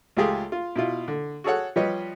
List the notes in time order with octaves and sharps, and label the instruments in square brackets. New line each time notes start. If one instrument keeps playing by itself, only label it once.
[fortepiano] C#2 A3 F4 G4 G#4
F4
B2 E4 F4
D3
F#4 G#4 A4 C#5 F#5
F3 G3 B4 C#5 D#5